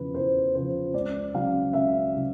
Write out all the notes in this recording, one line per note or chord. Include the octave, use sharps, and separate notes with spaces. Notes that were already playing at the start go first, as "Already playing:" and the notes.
Already playing: E2 C#3 F3 B4
E2 C5
C#3 F3 C5
C#2 D5
C#3 F#3 F5
C#2 E5
C#3 F#3